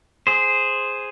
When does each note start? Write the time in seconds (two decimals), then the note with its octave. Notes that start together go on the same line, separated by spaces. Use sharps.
0.27 G#4 C5